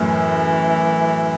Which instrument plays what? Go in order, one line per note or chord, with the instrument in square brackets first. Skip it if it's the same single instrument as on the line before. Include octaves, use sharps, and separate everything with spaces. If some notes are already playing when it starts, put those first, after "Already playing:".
Already playing: [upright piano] F#2 A2 [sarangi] E3